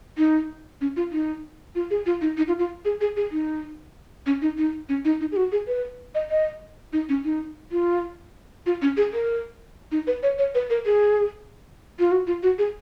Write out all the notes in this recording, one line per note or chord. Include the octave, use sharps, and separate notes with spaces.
D#4
C#4
F4
D#4
F4
G#4
F4
D#4
D#4
F4
F4
G#4
G#4
G#4
D#4
C#4
D#4
D#4
C#4
D#4
D#4
G#4
F#4
G#4
B4
D#5
D#5
D#4
C#4
D#4
F4
F4
C#4
G#4
A#4
D#4
B4
C#5
C#5
B4
A#4
G#4
F4
F#4
F4
F#4
G#4